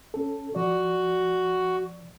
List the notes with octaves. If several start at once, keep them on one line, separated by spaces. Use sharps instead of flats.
C#4 A4
F3 F#4 D5